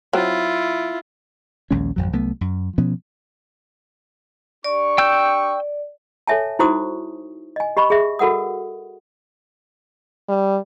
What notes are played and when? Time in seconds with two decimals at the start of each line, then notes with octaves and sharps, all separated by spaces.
0.13 F#3 C4 E4 F4
1.71 A#1 D#2 G#3 C#4
1.96 G#1 F2 F#3
2.13 C2 F#3 A3 B3
2.41 F#2
2.78 B2 F3 B3 C#4
4.64 D4 G4 D5 C#6
4.98 G5 E6 G6
6.27 A4 C#5 E5 G#5 A5
6.59 D#4 E4 F#4 C5 C#6 D#6
7.56 D#5 G#5
7.77 G4 D#5 B5 C#6
7.90 G#4 E5
8.19 F#4 A4 A#4 F#5 D#6
10.29 G3